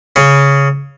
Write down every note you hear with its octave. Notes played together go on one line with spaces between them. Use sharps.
C#3